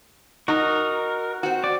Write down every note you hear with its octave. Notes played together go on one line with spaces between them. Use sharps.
D#4 F#4 A#4
C4 F#4
D5